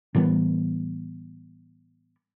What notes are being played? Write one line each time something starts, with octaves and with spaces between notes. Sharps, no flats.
A2 E3 G3 B3